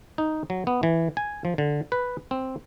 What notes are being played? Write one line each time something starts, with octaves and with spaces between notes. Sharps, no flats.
D#4
F#3
B3
E3
G#5
F3
D3
B4
C4